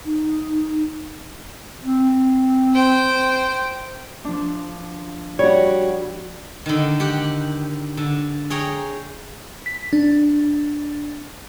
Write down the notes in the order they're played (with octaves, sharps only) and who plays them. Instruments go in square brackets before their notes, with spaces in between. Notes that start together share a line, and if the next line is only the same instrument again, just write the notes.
[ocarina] D#4
[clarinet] C4
[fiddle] C5 G5
[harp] F3 D4
[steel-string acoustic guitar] G3 F#4 [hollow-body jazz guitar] C#5
[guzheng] D3 D#3
G4 F#5 G5
D3
G#4 C#5 G5 A#5
[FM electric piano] B6
D4